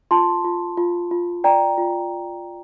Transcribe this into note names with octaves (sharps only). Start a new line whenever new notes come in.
F4 A5 C6
F4
F4
F4
D5 G5 A#5
F4